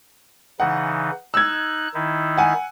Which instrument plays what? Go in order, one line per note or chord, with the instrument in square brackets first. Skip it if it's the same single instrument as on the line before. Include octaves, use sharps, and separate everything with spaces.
[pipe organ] C#3 E3 D#4 [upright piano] F#5
[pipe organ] D#4 F#6 [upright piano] E6 G#6
[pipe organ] D#3 D#4 E4
[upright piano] F#5 G#5